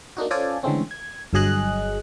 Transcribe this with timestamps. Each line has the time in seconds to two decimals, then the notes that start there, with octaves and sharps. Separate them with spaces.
0.17 A#3 D4 D#4 F#4
0.31 C#4 F4 A4 C5 D5 G#5
0.63 D3 E3 G#3 A3 C4 C#4
0.91 G#6
1.33 G1 G2 F#3 G#4 D#5 F#6